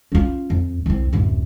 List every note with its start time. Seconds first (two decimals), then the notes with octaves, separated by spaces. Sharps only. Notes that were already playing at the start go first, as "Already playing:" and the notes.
0.12 C#4 F4
0.50 F2
0.86 C2 C4
1.13 D1 F#2